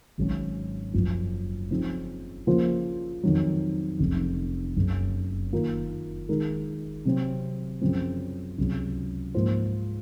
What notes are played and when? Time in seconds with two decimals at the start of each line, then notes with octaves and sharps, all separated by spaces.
0.18 G#1 G#2 F#3 C#4
0.94 F#1 F#2 F3
1.70 C#3 F3 C4 D#4
2.47 C#3 F3 A#3 F4 C5
3.23 F2 D#3 F#3
3.99 F1 F2 C#3
4.76 F#1 F#2 C#3
5.52 D#3 A#3 F4 A#4
6.29 D#3 G#3 D#4 A#4
7.05 C3 F#3 C4
7.81 F#2 C#3 F3 C4
8.58 C#2 C3 F#3
9.34 G#2 F3 A#3 F4 C5